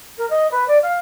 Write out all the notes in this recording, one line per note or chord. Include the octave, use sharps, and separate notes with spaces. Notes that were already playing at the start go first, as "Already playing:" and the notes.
A#4
D#5
B4
D5
F5